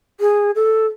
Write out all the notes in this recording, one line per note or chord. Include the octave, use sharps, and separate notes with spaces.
G#4
A4